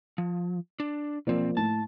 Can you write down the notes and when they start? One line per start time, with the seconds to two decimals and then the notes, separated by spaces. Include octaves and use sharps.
0.18 F3
0.80 D4
1.27 B1 F3 A#3 C4 D5
1.57 A2 A5